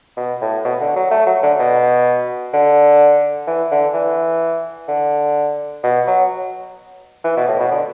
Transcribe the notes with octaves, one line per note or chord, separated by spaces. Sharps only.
B2
A2
B2
D3
F#3
A3
F#3
D3
B2
D3
E3
D3
E3
D3
B2
F#3
E3
B2
A2
B2
D3